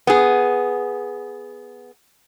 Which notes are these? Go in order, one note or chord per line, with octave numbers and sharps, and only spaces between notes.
B3 G#4